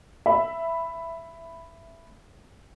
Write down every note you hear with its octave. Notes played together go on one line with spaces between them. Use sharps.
E5 B5